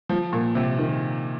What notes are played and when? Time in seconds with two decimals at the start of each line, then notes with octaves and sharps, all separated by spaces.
0.09 F3
0.33 A#2
0.55 C3
0.79 D#3